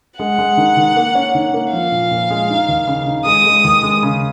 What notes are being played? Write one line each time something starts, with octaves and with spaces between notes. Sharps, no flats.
G#3 F#5
G#3
D#3
D#3
A#3
C#4
D#3
A#3
F3 F5
A#2
A#2
G#3
D#4
D#2
C#3
D#4
G#3 D#6
G#3
D#2
G#3
C#3